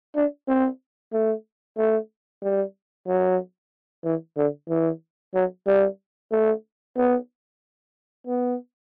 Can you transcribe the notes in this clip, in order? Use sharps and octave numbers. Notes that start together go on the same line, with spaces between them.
D4
C4
A3
A3
G3
F#3
E3
D3
E3
F#3
G3
A3
B3
B3